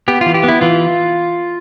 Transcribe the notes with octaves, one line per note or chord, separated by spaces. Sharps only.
B3 G4
E3 F4
G4
B3 E4
E3 F4